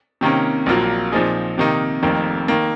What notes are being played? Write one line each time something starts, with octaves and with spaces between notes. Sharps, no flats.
C3 D#3 A#3 C#4
A#1 A#2 F#3 A#3 F4
A#2 F3 C4 D#4 G#4
C3 D#3 A#3 D#4
F1 F2 D#3 A#3
D#3 A#3